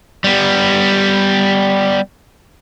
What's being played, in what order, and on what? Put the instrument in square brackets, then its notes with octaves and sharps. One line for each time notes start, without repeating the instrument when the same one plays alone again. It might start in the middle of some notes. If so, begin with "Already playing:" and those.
[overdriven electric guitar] G3 B3